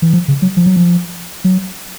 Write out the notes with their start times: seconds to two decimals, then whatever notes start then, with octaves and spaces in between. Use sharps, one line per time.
0.02 E3
0.13 F3
0.28 C#3
0.42 F#3
0.57 F3
0.66 F#3
0.76 F3
1.44 F#3